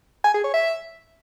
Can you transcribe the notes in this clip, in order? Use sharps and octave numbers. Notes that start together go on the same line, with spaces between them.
G#5
G#4
C#5
E5